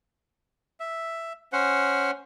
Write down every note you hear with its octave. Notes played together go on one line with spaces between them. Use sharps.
E5
C#4 C5 F#5